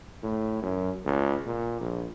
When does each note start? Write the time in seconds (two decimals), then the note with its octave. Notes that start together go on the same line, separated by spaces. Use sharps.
0.23 A2
0.62 F#2
1.05 C#2
1.46 A#2
1.81 A#1